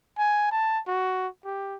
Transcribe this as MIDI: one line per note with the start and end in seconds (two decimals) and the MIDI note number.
0.18 0.50 80
0.51 0.79 81
0.87 1.28 66
1.45 1.77 67